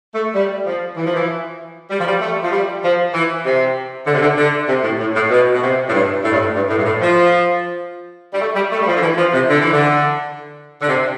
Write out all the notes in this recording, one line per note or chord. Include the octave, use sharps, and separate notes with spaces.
A3
G3
F3
E3
F3
E3
G3
F3
G3
A3
F3
G3
F3
E3
C3
D3
C3
D3
D3
C3
A2
A2
A2
B2
B2
C3
A2
G2
A2
G2
A2
G2
A2
G2
A2
F3
G3
A3
G3
A3
G3
F3
D3
E3
F3
C3
D3
E3
D3
D3
C3